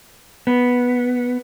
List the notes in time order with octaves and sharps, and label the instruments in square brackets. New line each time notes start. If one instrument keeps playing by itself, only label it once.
[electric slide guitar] B3